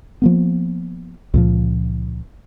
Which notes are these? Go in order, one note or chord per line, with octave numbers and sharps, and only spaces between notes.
F3 A#3 B3
C#2 A#2 F3